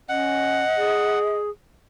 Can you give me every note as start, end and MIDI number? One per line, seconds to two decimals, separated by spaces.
0.09 0.63 61
0.09 1.37 75
0.09 1.19 78
0.77 1.50 68